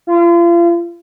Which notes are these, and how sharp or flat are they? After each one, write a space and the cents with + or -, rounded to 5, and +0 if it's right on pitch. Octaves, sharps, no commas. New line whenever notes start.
F4 -35